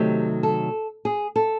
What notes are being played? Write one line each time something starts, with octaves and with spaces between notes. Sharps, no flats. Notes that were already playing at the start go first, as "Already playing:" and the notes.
Already playing: C3 D#3 F#3 A3 G4
A4
G#4
A4